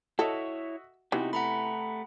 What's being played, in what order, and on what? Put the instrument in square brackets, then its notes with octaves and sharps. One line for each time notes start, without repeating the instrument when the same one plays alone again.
[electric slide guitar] E4 C#5 [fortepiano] F#4 D#5 E5 [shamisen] A4
[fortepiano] C3 B3 [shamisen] E3 [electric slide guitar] D#4 F#4 G4
[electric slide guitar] A3 [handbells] F#5 A#5 B5